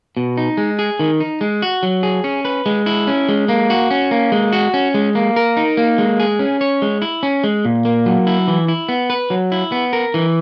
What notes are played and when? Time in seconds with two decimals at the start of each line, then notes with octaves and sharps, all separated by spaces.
0.17 B2
0.37 D#4
0.57 G#3
0.79 G#4
0.99 D#3
1.20 D#4
1.41 G#3
1.62 F#4
1.83 F#3
2.03 G#4
2.24 C#4
2.45 B4
2.66 G#3
2.86 E4
3.07 C#4
3.29 G#3
3.48 A#3
3.70 F#4
3.91 C#4
4.11 A#3
4.32 G#3
4.53 F#4
4.74 C#4
4.94 G#3
5.15 A#3
5.36 A#4
5.57 D#4
5.77 A#3
5.98 G#3
6.20 G#4
6.39 C#4
6.61 C#5
6.82 G#3
7.02 E4
7.23 C#4
7.44 G#3
7.65 A#2
7.85 A#3
8.06 F#3
8.27 E4
8.48 E3
8.68 E4
8.89 B3
9.10 B4
9.30 F#3
9.52 E4
9.72 B3
9.93 A#4
10.14 E3